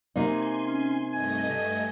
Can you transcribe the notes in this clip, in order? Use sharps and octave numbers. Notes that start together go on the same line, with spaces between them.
C3 A#3 D#4 G#5 C6
C#4
G2 A3 D#5 G#5